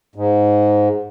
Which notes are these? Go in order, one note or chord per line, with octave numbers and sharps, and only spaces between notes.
G#2